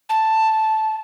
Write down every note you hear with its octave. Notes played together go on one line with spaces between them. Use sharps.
A5